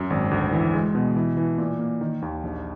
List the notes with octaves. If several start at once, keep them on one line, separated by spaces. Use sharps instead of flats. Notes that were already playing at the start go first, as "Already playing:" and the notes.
Already playing: F#2
G#1
D2
E3
G#3
B2
E3
E3
A#2
A#3
D#3
D#2
A#1